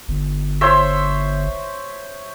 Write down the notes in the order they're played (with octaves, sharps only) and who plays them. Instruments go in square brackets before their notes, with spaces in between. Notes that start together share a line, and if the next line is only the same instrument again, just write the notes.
[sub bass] G1
[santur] C5 C#5 E5